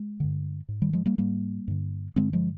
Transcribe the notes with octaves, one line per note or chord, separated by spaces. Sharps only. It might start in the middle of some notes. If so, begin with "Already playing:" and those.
Already playing: G#3
G2 D3
G#2
D#3 G3
F3 G#3
G3 A#3
G#2 G3 A#3
G2 D3
G2 D3 G#3 C4
F3 G#3